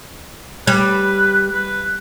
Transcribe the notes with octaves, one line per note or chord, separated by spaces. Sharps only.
G3 B4
B4